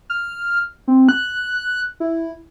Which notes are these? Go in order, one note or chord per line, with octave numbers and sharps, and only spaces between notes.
F6
C4
F#6
E4